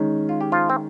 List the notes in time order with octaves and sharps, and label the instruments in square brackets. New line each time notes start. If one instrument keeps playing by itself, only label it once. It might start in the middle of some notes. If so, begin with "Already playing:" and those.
Already playing: [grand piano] D#3 G#3 C#4
[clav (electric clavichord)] F4
G4
F3 F4
C4